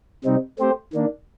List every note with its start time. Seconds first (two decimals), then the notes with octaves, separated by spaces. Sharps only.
0.24 C3 G3 C4 D#4
0.58 A3 C4 G4 C5
0.93 D#3 A#3 D4